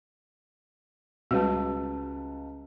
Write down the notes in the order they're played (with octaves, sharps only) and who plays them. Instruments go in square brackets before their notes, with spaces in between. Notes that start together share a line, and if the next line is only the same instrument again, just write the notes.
[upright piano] C#2 B4 A5 [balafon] G3 G#3 F#4